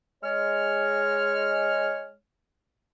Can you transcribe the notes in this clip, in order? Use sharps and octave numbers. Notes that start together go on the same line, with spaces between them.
G#3 C#5 F6